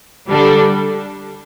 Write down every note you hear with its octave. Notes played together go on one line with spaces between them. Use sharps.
D3 G3 D4 A4